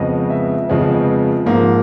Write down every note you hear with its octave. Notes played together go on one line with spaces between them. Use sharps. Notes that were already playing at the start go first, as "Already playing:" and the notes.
Already playing: F2 C#3 F3 G#3 B3 D#5
E5
F2 C#3 F3 G#3 B3
G#2 F3 A#3